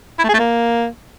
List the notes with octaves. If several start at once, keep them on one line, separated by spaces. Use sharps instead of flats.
E4
A3
G#4
A3
A#3